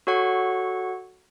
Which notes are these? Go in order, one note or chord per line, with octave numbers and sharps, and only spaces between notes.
F#4 A4 C#5 F#5 C#6